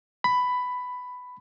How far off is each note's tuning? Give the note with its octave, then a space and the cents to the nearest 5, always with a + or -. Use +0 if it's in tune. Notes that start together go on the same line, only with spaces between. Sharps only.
B5 +10